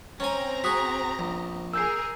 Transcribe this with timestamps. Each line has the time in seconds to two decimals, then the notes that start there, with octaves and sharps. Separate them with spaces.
0.20 C4 C#4 G#5 A#5 A#6
0.64 F#4 G#4 D#6 B6
1.19 A#1
1.74 G#4 A#4 E6 G6 C7